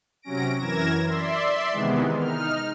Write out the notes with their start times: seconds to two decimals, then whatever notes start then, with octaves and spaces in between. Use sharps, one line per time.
0.22 C3 F#3 C#4 A#6 D7
0.59 F#2 E3 A#4 G#6 A#6 E7
1.04 D5 E5 C6
1.71 C3 D#3 E3 G#3 B3
2.16 D#4 F6